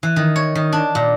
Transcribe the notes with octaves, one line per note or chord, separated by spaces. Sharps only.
E3
D#3
C#5
D#3
D4
A#2